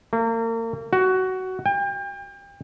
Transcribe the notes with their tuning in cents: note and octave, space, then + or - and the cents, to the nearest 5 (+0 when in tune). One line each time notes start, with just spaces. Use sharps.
A#3 -35
F#4 +15
G5 +35